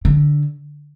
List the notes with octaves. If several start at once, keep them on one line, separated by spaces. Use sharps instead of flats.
D3